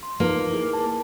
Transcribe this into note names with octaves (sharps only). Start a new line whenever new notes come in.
C6
A#3 D#4 F4 B4
E4 G#4
A5